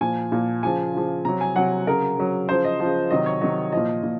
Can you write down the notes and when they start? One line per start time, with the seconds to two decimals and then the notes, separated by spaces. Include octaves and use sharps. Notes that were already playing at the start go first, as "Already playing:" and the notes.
0.01 A#2 F3 G#5
0.32 A#2 F3
0.63 C#3 F3 G#5
0.94 C#3 F3
1.25 C3 F#3 A#5
1.41 G#5
1.56 C3 F#3 F#5
1.87 C#3 F#3 A#4
2.18 C#3 F#3
2.49 C#3 F3 C5
2.64 D#5
2.80 C#3 F3
3.11 C3 D#3 F#3 D#5
3.26 C#5
3.41 C3 D#3 F#3 D#5
3.72 A#2 F3 D#5
4.03 A#2